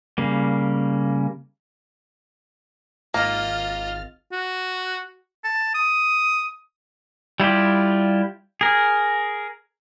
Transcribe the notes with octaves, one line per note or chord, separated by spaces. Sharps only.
C#3 G3 A#3
G#1 A#3 F4 D#5 F6 A6
F#4
A5
D#6
G3 E4 F4 G4
G#4 A#4